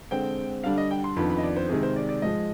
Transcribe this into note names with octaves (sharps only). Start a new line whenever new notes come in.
D3 G#3 C4 G5
D3 G3 D4 F5
D#5
G5
C6
F2 D#3 B3 D4 B5
B5
D#5
D5
C5
C3 D#3 G#3 G#4
C5
D5
D5
G#2 F3 G#3 D#5